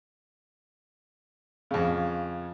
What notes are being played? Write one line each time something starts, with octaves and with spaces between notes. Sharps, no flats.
F2 C#3